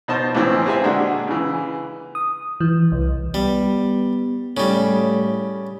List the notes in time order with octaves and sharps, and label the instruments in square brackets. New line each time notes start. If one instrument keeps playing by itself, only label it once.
[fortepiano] B2 D#4 C5 A5
C#2 A2 E3 C4 C#4
C4 G4 G#4 E5 G#5
A#2 D3 G#3 D4 F#4
C#3 E3
[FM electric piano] D#6
E3
C2
[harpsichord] G3 [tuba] B3
[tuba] A2 [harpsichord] C#3 G3